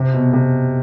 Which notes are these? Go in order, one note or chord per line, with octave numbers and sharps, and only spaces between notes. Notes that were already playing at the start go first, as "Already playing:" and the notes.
Already playing: C3
B2
C3